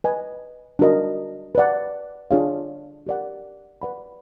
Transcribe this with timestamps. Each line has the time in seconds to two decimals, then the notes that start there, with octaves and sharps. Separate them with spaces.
0.04 B4 D#5 G#5
0.79 D4 F#4 A#4 D#5
1.55 B4 D5 F#5
2.31 D4 F4 G#4 C#5 F5
3.07 G4 A#4 D5 F#5
3.82 B4 D5 F#5 B5